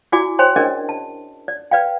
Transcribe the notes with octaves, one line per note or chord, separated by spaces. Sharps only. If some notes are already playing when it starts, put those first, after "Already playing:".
E4 F#4 D5 G#5 D6
C5 C#5 G5 G#5 C6
C#4 D4 G#4 A#4 D5 D#5
A5
D5
B4 D5 F5 G5